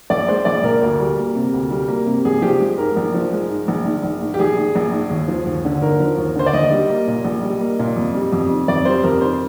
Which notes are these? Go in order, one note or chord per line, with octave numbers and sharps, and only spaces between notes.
A#1 D5
G#3 C5
A#1 D5
A#2 A#4
D2
G3
A#3
C3
D2
G3
A#3
C3
A#1 G#4
F3 G4
G#3
G#2 A#4
A#1
F3
G#3
G#2
A#1
D#3
A#1
G#2
G4
A#1 G#4
D#3
A#1
G#2
D#2
F3
D#2
D3
D#2 A#4
F3
D#2
D3 C5
D5
A#1 D#5
G3
A#3
A#2
A#1
G3
A#3
A#2
F2
G3
F2
D#3
F2 D5
G3 C5
F2 A#4
D#3 C5